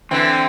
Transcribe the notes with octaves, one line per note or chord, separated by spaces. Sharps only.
D3 E3 C4